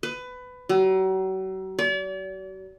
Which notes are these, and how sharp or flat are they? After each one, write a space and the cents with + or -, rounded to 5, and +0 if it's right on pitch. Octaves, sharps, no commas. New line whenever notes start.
B4 +20
F#3 +40
D5 -40